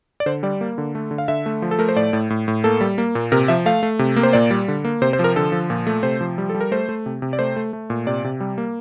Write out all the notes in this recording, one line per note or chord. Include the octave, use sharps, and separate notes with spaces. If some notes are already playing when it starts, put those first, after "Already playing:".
D5
D3 C5
G3 D5
A#3
D3
A3
D3
F5
D3 E5
A3
F3
A4
A3 A#4
C5
A2 D5
A2
A2
A2
A#3 A4
G3
A#3
A#2
C3 A#4
F3 E5
A3 F5
A3
C3
A#3
C5
A#2 D5
G3
D3
A#3
C3 C5
C5
F3
A#4
D3 A4
F3
A#2
A3
C3 C5
F3
G3
A4
G3
A#4
A3 C5
A3
C3
C3
D5
A3 C5
A3
A3
A#2
C3 D5
C3
G3
A#3